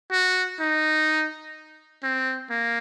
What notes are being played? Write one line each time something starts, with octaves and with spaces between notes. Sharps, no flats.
F#4
D#4
C4
A#3